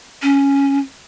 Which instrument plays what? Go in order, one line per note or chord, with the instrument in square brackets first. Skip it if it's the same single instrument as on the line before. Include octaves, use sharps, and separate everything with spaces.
[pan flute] C#4